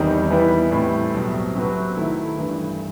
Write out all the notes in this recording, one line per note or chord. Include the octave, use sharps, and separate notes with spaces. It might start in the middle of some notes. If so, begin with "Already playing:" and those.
Already playing: E2 C3 D#3 G3 D#4
E3 G3 B3 E4
A2 G3 C4
C2 B2 F#3
C3 F#3 C4 F#4 B4
D#3 A3 E4
G2 E3 A3